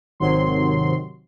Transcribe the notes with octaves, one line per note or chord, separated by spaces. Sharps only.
G#1 C3 D#3 F#3 C6